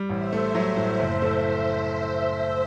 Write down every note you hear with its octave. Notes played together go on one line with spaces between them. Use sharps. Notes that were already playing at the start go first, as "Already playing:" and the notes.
Already playing: G3
A1 C5 E5
A3
F#3
A2
F#1
A3